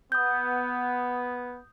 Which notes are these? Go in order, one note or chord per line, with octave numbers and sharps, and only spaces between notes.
B3 D#6 G6